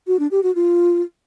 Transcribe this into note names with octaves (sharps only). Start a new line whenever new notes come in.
F#4
D4
G4
F#4
F4